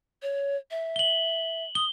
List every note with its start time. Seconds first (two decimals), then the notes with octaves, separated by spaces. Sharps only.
0.22 C#5
0.71 E5
0.96 F#7 G7
1.75 D#6 G7